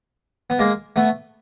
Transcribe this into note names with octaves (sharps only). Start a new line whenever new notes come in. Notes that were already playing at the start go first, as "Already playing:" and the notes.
B3
G#3 A#3
A3 B3